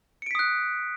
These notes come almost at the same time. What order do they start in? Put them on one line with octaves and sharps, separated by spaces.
C#7 D7 B6 D#6 F#6